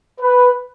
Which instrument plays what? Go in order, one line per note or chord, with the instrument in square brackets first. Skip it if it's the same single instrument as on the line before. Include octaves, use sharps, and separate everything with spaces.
[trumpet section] B4